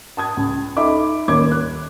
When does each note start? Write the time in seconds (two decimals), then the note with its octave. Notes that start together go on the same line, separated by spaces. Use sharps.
0.17 A5 D#6 G#6
0.37 C#2
0.77 D#4 A4 D#5 E5 B5 D6
1.28 D#1 A#3 C#5 D6 G#6
1.51 F#6